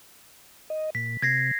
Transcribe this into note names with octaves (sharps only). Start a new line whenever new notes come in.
D#5
A#2 B6
C3 G#6 A#6 C7